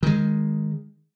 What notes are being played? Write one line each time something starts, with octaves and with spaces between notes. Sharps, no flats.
D#3 G#3